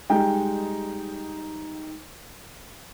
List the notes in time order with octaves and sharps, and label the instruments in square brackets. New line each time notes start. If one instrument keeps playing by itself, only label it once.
[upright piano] G3 G#3 D#4 G5